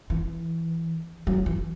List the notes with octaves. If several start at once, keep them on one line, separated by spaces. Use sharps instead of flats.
E3
F#3
E3